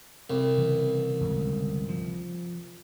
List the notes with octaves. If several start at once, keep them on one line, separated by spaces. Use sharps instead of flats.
C2
C#3 E3
G1 C#2
F3